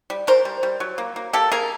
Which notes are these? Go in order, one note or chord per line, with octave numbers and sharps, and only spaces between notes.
G3
G3 A#4 C5
G3
G3
F#3
A#3
A#3
A#3 G4 A4
A#3 G#4 A#4